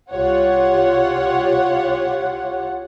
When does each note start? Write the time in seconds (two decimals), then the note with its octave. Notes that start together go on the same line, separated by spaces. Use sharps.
0.11 C2 F4 G4 C#5 F#5